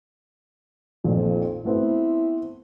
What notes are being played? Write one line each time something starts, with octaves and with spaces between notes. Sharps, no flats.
A#1 F2 A#2 D#3
A3 B3 C4 E4